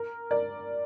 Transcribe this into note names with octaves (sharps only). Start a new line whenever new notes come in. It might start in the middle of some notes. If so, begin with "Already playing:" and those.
Already playing: A#4
A#4 D5